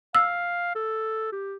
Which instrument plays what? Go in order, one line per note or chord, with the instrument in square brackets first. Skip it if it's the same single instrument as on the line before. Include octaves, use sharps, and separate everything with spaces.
[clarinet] F5 [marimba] E6
[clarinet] A4
G4